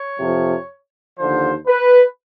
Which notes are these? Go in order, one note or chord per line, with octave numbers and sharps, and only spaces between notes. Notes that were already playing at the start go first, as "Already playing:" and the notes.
Already playing: C#5
F2 C3 F3
D#2 D3 F3 C5
B4